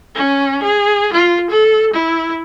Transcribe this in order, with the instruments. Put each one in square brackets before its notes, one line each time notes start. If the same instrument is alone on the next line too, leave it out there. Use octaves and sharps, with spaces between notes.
[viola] C#4
G#4
F4
A4
E4